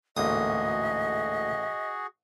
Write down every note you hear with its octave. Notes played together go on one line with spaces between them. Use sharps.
A1 D2 G#2 A#3 F#4 G#4 D#5 D#6